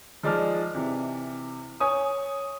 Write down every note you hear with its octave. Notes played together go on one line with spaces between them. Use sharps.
F3 G#3 D#4 D5 A5 F6
C3 E3
C#5 G#5 D#6